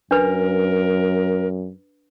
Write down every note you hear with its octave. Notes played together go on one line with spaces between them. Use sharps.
F#2 D4 A#4 B4